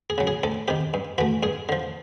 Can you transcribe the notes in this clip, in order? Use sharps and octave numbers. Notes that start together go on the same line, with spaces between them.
G#4
C#3 F#3
G#4
D2 A4
C3 D#3 G4
G2
E3 A3 F#4
G2 G#4
D3 F3